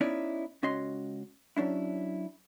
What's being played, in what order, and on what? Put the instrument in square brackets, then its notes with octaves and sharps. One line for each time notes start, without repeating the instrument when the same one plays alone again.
[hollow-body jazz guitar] B3 C#4 D#4 E4 C#5 D5
C#2 C#4 F#4 D#5 C6
F#3 C#4 D4 E4